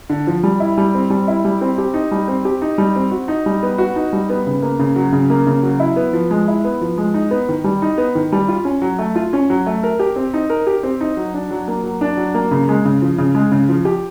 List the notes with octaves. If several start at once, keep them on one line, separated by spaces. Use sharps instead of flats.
D3
F3
G3
E4
G3
C4
G3
E4
G3
C4
G4
D#4
G3
C4
G4
D#4
G3
C4
F#4
D#4
G3
B3
F#4
D#4
G3
B3
C#3
A#3
C#3
F#3
C#3
A#3
C#3
F#3
E4
B3
F3
G#3
E4
B3
F3
G#3
D#4
B3
D#3
G3
D#4
B3
D#3
G3
F4
C#4
F#3
A3
F4
C#4
F#3
A3
A#4
G4
C4
D#4
A#4
G4
C4
D#4
F#3
D4
F#3
A#3
F#3
D4
F#3
A#3
C#3
G#3
C#3
F3
C#3
G#3
C#3
F3
G4